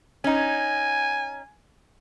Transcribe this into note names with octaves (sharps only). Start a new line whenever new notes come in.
C#4 D#4 G#5